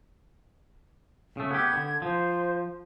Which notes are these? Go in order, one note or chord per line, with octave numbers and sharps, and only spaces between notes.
C#3 A3
B3 G4 G#6
D3
F3 C5